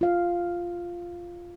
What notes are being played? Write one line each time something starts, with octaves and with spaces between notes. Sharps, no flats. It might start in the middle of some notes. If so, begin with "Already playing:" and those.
F4 F5